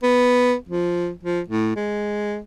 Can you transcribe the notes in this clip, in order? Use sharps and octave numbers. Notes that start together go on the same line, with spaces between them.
B3
F3
F3
A2
G#3